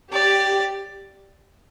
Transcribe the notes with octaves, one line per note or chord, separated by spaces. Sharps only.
G4 D5